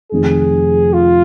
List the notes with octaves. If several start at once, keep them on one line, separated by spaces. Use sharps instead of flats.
F1 F2 D#3 G#4
F4